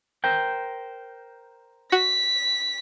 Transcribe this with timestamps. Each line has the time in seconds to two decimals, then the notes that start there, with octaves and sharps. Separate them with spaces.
0.24 A#4 C5 G5
1.92 F#4 B6